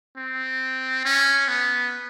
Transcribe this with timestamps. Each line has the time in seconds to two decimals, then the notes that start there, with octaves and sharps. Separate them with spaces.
0.17 C4
1.05 C#4
1.48 B3